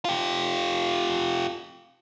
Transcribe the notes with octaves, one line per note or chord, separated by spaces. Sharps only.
F4 G4